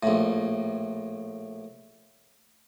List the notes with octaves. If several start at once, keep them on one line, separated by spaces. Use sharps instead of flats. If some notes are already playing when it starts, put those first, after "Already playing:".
A#1 A2